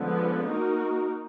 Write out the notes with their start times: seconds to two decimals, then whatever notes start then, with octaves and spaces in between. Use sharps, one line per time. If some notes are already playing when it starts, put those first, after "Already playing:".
Already playing: D3 F3 G#3 B3
0.48 A#3 D#4 F#4 A#4